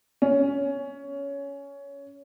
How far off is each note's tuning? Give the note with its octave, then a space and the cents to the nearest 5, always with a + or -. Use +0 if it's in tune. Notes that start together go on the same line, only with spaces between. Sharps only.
C#4 +15